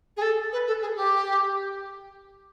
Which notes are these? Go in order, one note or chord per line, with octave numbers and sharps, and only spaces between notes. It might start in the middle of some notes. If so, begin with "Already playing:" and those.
G#4
A4
B4
A4
G#4
G4